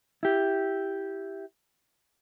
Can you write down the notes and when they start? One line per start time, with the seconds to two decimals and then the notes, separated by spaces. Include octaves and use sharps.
0.23 E4 G4